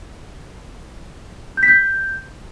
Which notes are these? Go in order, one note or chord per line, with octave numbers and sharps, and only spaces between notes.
G6
B6
G6